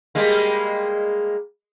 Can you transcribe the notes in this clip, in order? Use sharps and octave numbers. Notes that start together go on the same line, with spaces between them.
G3 G#3 A#3